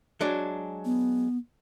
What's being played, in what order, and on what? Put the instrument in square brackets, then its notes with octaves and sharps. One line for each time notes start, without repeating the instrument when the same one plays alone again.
[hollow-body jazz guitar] F#3 G#3 D4
[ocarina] B3